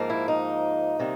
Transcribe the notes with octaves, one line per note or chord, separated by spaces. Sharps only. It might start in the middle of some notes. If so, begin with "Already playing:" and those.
Already playing: G#2 F3 A#3
E4
D#4
C3 D#3 G3 A#3